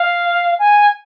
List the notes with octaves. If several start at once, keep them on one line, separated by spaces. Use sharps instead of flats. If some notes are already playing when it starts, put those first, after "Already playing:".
Already playing: F5
G#5